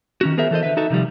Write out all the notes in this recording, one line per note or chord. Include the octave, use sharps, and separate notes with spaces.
D#3 C#4 F#4
B3 G#4 A#4 C5 E5
E3 A4 C5 D#5
D3 B4 E5
D#4 F#4 A4 E5
C3 D#3 F3 G3